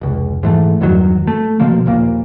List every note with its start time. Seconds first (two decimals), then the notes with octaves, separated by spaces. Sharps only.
0.01 F1 C#2
0.43 G#2 E3 A3
0.81 E2 G2 D#3 F#3
1.27 A3
1.60 B2 D3 F3 A#3
1.86 D#1 A#1 A#2 A#3